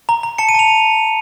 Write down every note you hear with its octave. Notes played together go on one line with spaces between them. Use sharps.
A#5
A#5
A5 C#7
D#7
A5 F7